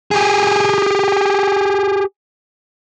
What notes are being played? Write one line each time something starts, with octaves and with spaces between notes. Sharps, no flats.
G4 G#4